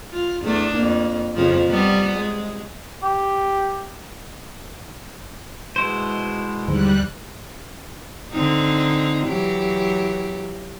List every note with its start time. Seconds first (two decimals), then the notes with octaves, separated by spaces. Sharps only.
0.12 F4
0.43 E2 A3 D4
0.74 F2 A#3
1.35 F2 C#3 F3
1.66 C3 G3 B3
2.16 G#3
3.03 G4
5.76 B2 G#3 E4 C5
6.68 D#2 G#2 D3 F3 G3 F#6
8.32 D3 C4 D#4
9.26 E3 F#3 G4